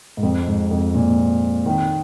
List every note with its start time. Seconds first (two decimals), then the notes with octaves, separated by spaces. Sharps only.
0.17 G#2
0.23 F2
0.47 G#2
0.71 F2
0.95 A#2
1.66 D#3